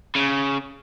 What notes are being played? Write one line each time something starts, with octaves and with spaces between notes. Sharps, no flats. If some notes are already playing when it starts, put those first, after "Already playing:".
C#3